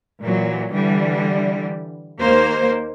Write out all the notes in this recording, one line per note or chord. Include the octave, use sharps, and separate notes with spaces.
A#2 E3 F#3
D3 E3 G3
D#2 A#3 C5